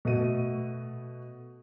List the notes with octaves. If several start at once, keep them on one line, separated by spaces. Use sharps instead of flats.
B2 A3 F#4 D#7